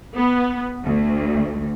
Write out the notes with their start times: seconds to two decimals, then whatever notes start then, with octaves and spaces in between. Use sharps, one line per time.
0.15 B3
0.86 D2